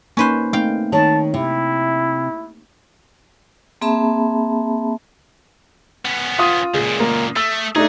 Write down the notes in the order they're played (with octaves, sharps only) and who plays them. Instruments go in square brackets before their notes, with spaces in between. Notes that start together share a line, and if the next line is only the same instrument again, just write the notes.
[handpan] A#3 D#4 [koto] C#4 B4 C5
[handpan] A3 C4 D#4 [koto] F5 G5
[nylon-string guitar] D#3 C#5 [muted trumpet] A5
[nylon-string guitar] C3 [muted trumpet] E4
[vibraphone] A#3 C4 G#4 E5 A5 B5
[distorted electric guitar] B3 C#4
[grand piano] F4 D#6
[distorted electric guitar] C#2 A#2 [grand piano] G#4
[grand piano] A#3
[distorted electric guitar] A3 [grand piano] E6
[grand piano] A3 D4 D#4 [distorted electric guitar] G#4